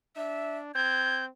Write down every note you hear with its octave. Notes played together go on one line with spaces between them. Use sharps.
D4 E5
C4 G6 G#6